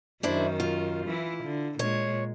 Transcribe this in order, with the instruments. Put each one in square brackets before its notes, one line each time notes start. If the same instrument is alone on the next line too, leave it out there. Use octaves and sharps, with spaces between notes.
[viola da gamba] F#2 D#3 [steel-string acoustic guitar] D4 E4 C5
[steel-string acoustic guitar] F4
[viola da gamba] E3 E4
D3
[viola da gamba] A#2 G#3 [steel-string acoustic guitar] C#5